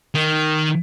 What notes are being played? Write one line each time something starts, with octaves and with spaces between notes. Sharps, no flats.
D#3